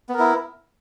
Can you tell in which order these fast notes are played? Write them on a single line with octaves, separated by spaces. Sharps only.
B3 A#4 E4